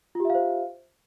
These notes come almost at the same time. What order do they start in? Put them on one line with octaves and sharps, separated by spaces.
F4 G4 E5 F5 C5